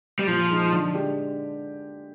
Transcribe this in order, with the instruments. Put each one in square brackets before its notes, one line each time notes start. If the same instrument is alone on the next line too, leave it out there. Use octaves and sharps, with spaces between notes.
[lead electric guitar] G3
[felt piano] A#2 [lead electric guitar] F3
[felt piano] G#3 D#4
D3
G#3 D4 G4